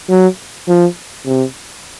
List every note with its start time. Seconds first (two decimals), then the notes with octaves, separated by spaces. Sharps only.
0.10 F#3
0.68 F3
1.26 C3